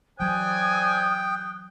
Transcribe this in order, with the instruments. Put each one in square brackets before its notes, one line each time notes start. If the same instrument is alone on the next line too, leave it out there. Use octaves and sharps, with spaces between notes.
[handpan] E3 F#3 [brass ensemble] C5 D5 G#5 [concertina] G5 [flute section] D#6 F#6